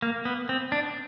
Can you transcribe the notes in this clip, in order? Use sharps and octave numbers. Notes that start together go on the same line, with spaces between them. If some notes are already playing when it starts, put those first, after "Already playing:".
A#3
B3
C4
D4